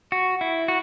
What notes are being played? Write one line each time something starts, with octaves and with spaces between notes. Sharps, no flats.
F#4
E4
F#4